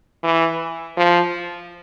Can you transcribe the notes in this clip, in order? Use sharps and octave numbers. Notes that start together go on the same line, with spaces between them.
E3
F3